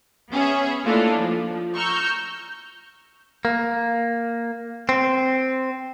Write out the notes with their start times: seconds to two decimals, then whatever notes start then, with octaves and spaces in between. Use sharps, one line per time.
0.31 B3 C#4 G#4 C#5 E5
0.85 A3 A#3 D4 E4 F4 A4
1.18 F3
1.76 A#5 C#6 E6 F6 G6
3.45 A#3
4.89 C4